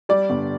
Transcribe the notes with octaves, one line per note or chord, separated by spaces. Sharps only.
G3 D5
G1